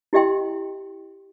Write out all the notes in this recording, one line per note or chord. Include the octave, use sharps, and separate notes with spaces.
E4 G4 D#5 E5 G5 C6